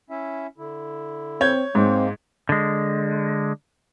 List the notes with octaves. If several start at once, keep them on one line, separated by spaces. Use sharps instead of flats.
C#4 E4 E5
D3 E4
C4 C#5 G6 G#6
G#2 G#3 A#3 C4 F5
D3 G#3